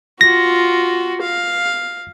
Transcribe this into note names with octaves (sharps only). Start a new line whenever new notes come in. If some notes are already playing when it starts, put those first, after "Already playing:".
F4 F#4 A#6
F5